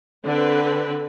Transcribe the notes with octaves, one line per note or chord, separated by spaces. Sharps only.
D3 C4 B4